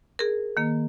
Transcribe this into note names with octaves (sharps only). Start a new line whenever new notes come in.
G#4 A#4
D#3 A#3